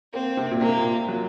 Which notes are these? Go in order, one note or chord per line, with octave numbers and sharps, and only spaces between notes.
A#3 C4
C3
A#2
C3 A#3
A#2
F#3